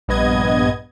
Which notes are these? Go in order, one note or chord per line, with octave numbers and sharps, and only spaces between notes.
A#1 G2 B3 D#5 G#6